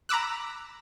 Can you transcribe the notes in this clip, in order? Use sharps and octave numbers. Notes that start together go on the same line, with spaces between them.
A#5 B5 D6 E6 F#6